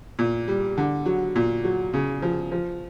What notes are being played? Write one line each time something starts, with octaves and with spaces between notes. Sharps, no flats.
A#2
G3
D3
F#3
A#2
F#3
C#3
F3
F3